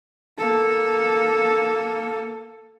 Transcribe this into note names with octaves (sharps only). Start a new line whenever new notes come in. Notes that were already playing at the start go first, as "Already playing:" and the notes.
A#3 A4